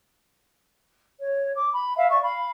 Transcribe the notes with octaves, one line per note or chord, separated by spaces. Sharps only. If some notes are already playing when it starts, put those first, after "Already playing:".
C#5
D6
B5
E5 F5
D5 C#6
F5 B5